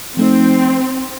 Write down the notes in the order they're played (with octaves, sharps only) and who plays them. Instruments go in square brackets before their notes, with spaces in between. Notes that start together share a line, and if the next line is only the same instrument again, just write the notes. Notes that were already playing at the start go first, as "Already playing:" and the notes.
[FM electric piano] F3 A3 D#4 [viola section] C4